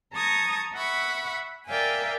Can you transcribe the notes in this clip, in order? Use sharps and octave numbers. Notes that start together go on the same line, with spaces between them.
A5 A#5 C#6 D#6 G#6 A#6
E5 F#5 B5 C#6
A#4 D5 E5 F5 G5 G#5